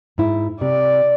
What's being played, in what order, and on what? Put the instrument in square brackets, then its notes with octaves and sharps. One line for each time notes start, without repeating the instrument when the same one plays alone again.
[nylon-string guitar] G#2 E4
[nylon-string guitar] C3 [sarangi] D5